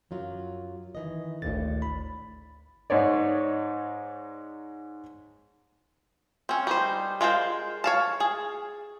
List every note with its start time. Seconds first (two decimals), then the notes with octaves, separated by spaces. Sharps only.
0.11 F#2 F#3 F4
0.95 D#3 E3 D#5
1.42 G#1 D2 A2 D3 A6
1.82 B5
2.90 G#2 D#4 C#5 D5
6.49 C4 C#4
6.67 G3 D#4 C5
7.21 G#3 F4 A#4 C5
7.84 C#5 F5 A5
8.20 G#4